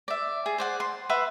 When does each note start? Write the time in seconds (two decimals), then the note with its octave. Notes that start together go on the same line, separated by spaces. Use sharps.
0.08 D5 E5
0.46 G#4
0.58 C5 D5 F#5
0.80 C6
1.10 B4 E5 F#5 C6